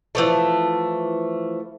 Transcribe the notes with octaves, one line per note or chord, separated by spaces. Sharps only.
E3 F3 A3